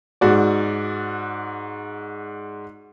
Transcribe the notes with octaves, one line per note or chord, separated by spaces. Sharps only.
G#2 F#4 D5